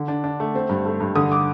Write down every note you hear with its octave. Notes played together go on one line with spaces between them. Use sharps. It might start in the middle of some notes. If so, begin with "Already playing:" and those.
Already playing: D3
D4
D4
A3
C4
G2
A3
G2
D3 D#6
D6